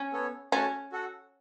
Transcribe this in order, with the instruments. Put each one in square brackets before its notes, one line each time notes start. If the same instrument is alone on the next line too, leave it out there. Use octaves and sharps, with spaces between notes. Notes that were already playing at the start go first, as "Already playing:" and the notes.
Already playing: [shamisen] C#4
[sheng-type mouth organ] B3 A4 C#5
[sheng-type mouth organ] A3 F#4 C#5 A5 [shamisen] C#4
[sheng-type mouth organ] F#4 A4 F#5